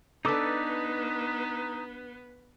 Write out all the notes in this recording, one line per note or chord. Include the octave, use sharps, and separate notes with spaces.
B3 D4 D#4 A4 B4 D6 E6